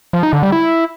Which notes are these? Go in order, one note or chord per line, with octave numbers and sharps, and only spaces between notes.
F3
D#4
D3
G3
E4